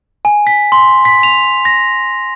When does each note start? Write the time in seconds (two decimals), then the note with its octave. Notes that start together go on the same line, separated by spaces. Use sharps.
0.25 G#5
0.47 B6
0.72 C6
1.05 B6
1.23 F7
1.65 A#6